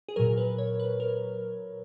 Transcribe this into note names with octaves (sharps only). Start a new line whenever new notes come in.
G#4
A#2 F#3 A#4
B4
C#5
B4
A#4